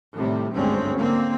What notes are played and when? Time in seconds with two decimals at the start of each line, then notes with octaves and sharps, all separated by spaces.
0.16 A2 C3 D#3 G3
0.54 G#1 D2 G2 G#3 C4 C#4
0.96 D3 A#3 C4